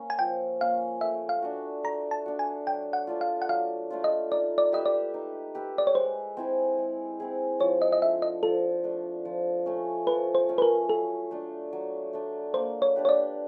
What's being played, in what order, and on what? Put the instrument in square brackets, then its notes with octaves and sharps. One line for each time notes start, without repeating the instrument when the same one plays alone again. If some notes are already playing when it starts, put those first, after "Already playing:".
Already playing: [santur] A#3 C#4
[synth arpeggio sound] G#5
[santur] F3 [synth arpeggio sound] G5
[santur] A#3 C#4 [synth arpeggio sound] F5
[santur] A3 [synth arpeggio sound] E5
[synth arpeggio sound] F5
[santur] D4 F#4
[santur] A3 [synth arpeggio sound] A#5
[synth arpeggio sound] A5
[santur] D4 F#4
[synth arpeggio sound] G#5
[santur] F#3 [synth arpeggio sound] G5
[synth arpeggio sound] F#5
[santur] A3 D4 F4
[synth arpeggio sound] F5
F#5
[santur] F#3 [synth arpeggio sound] F5
[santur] A3 D4 F4
[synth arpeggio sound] D#5
[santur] D#4 [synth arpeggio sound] D5
[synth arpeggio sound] D5
[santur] G4 B4 E5 [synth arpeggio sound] D#5
[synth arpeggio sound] D5
[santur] D#4
G4 B4 E5
[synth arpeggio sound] D5
C#5
[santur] G#3 [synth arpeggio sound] C5
[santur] C4 E4 G#4
G#3
C4 E4 G#4
[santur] F3 [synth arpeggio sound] C#5
[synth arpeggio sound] D#5
D#5
[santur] A3 D4 [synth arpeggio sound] E5
[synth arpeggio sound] D#5
[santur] F3 [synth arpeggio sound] A4
[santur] A3 D4
F3
A3 C#4
[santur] F3 [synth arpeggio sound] B4
[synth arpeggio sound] C5
[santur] A3 C#4
[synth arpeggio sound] B4
A#4
[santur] F#3 [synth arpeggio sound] A4
[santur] A3 D4
F#3
A3 D4
[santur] A#3 [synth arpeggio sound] C5
[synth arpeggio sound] C#5
[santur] D4 G4 B4
[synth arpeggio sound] C#5
D5